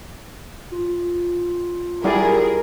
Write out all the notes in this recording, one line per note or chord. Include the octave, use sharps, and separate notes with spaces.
F4
G3 E4 G#4 A#4 D5